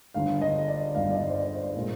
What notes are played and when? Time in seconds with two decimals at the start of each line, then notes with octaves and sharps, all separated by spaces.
0.14 G1 G2 D3 F5
0.42 D#5
0.68 D5
0.95 G1 G2 D3 F5
1.10 D5
1.15 D#5
1.30 C5
1.35 D5
1.55 C5
1.76 A#2 G#3